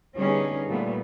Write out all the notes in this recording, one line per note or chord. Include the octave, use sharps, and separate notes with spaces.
D3 G3 B3 C#4 D#4 G#4
A#2 G3 A3 B3